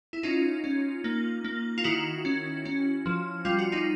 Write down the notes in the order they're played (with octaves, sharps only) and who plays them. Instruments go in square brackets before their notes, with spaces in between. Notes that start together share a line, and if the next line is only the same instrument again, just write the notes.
[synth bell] E4
C#4 D#4 F4
C#4
A#3
A#3
F4
D#3 E4 F#4
C#4
C#4
F3
G3 F4
F#4
D#4 F4